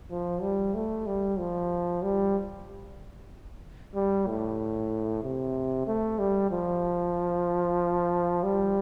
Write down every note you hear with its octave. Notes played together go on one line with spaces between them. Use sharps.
F3
G3
A3
G3
F3
G3
G3
A2
C3
A3
G3
F3
G3